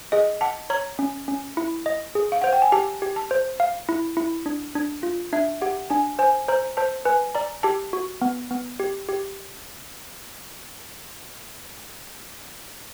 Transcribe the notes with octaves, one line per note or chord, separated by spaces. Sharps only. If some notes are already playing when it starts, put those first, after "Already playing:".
G#4 D#5
F#5 A5
C#5 A#5
C#4
C#4
E4
D#5
G#4
F5
C5 F#5
G5
G#5
G4 A5
G4
A5
C5
F5
E4
E4
D4
D4
F4
D4 E5
G4 F#5
D4 G#5
C5 G#5
C5 A#5
C5 A5
B4 G#5
D5 A#5
G4 A5
F#4
B3
B3
G4
G4